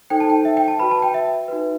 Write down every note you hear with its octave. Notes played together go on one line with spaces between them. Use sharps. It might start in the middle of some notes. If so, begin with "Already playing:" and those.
D#4 A4 C5 G5
A5
G5
E5
G5
A5
F#4 B4 B5
A5
G5
E5
D#4 F#4 B4